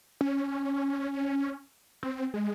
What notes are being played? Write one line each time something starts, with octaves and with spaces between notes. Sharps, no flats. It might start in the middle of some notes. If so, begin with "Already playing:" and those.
C#4
C4
G#3